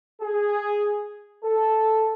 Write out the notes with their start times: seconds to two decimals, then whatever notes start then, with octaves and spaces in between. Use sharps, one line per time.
0.22 G#4
1.45 A4